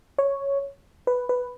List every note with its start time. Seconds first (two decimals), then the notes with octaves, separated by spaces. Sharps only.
0.18 C#5
1.07 B4
1.29 B4